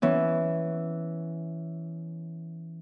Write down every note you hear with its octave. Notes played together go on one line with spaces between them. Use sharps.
E3 B3 C#4